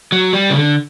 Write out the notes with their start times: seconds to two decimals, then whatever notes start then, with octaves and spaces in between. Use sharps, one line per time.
0.12 F#3
0.33 G3
0.50 C#3
0.55 D3